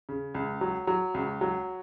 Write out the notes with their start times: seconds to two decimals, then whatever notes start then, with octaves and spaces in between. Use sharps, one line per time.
0.09 C#3
0.34 C#2
0.61 F#3
0.87 F#3
1.14 C#2
1.41 F#3